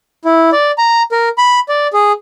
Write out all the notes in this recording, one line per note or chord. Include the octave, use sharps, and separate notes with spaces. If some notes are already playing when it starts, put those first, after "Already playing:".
E4
D5
A#5
A#4
B5
D5
G#4